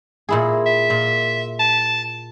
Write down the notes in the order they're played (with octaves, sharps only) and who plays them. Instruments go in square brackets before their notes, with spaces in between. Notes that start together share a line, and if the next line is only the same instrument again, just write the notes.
[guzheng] A#2 E4 G#4
[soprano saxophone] E5
[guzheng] A#2
[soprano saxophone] A5